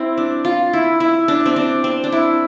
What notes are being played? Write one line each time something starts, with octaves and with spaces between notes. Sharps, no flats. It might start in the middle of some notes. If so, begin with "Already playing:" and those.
Already playing: C4 E4
D4
F4
E4
E4
D4
C4
D4
C4
D4
E4